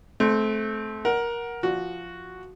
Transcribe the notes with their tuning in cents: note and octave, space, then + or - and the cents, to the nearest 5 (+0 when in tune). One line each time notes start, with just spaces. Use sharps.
A3 -25 C4 +0
A#4 +15 F#5 +0
F3 -10 F#4 +0